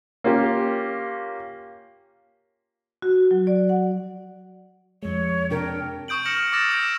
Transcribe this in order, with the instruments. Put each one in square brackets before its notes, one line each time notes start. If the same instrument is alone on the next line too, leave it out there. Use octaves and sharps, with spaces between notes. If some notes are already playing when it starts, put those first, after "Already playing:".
[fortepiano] A#3 C#4 F4 G4
[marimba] F#4
F#3
D5
F#5
[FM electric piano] F2 G#3 [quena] C#5
[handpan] C3 D4 A#4 [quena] G5
[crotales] C#6 D#6 G6 D7 F#7
D#6 F6 A#6 C#7 E7 F#7
D6 E6 A6 A#6 E7
D#6 G6 D7
E7